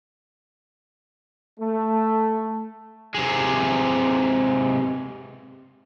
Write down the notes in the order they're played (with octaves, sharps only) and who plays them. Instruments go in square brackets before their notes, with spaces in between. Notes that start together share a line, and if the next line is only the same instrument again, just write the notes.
[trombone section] A3
[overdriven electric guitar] C3 G#3